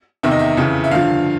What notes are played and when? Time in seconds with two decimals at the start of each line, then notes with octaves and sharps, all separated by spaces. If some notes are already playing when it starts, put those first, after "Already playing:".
0.23 E2 C3 D#3 E5
0.31 D#5
0.39 E5
0.57 F2 C#3 E3
0.84 E5
0.91 G2 D3 F3 F5